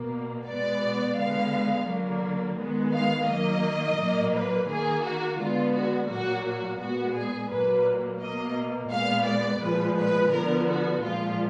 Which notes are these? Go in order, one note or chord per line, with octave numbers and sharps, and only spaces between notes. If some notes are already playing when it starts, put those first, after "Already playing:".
Already playing: B2 A#3
B2 G#3 B3 D5
D3 G#3 B3 F5
D3 F#3 A#3
D#3 G#3 B3
F5
D#3 F#3 A#3 D#5
A#2 F#3 A#3
B4
D#3 A#3 G#4
F#4
D3 G#3 B3 F4
F#4
A#2 F#3 A#3 F#4
F#4
A#2 G#3 B3 F#4
G#4
A#2 F#3 A#3 B4
B2 A#3 D#5
A#2 G#3 B3 F5
D5
A#2 F3 G#3 B4
B4
D3 F3 B3 A#4
F#4
A#2 F3 G#3 F4